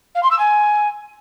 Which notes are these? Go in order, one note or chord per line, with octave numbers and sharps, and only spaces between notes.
F5
C6
E6
G#5